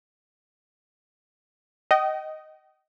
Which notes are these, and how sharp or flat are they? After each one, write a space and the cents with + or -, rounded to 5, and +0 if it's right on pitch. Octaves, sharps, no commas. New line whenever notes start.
D#5 +0 G5 -40